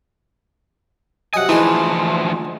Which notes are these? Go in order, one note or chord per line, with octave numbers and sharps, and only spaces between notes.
C3 F#3 D#5 F#5 G#5
D2 E3 F3 D#4 G#4 G#5